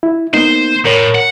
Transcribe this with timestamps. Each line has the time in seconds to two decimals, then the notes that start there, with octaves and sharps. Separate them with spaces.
0.03 E4
0.34 A#3 B3 D#4 C5
0.85 A2 A#4 C#5
1.14 F#5